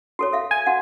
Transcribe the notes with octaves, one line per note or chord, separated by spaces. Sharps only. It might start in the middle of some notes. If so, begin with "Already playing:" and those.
F#4 A4 C#5
A4 E5 F5
G#5
F#4 F5 F#5